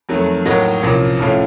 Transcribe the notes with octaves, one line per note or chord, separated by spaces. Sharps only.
F2 D#3 F#3 A3
A2 F#3 A#3 D#4 F#4
C2 A#2 F3 A#3 C#4
A2 F3 A3 C#4 F4